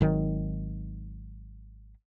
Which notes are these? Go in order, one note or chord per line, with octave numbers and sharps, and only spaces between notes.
G#1 D#3 F#3